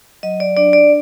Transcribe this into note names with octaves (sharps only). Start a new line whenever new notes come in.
F#3 D#5
D5
D4 D5
D5